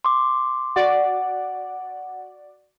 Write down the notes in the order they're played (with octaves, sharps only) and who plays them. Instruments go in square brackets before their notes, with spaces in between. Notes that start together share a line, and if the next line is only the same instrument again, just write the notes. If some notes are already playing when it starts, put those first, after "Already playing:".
[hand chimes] C6 D6
[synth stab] F#4 D5 [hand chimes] F#5